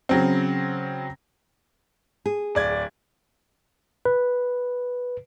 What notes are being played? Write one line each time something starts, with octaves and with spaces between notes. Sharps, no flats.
C#3 F#3 C4
G#4
D1 D5 G#6
B4